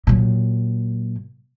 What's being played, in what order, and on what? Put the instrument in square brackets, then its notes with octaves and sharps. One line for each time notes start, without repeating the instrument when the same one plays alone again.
[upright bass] A#2 F#3